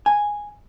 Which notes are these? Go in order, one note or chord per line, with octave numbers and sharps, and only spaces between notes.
G#5